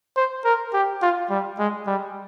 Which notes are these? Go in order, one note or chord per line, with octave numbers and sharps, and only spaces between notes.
C5
A#4
G4
F4
G3
G#3
G3